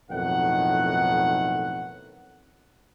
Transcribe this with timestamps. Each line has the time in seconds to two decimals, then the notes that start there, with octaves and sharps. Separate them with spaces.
0.11 B1 F2 A2 D#3 F#5